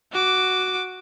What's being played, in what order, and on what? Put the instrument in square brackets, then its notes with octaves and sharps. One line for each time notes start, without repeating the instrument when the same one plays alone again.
[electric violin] F#4 D6